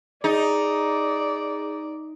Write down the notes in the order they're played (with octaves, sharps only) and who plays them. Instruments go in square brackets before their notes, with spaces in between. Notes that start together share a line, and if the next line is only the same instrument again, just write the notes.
[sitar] D#4 [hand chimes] G#4 [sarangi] D5